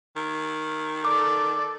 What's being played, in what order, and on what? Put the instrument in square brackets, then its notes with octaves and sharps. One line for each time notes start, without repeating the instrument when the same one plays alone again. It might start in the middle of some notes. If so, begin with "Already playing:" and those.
[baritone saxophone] D#3
[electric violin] A4 D5 [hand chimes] D6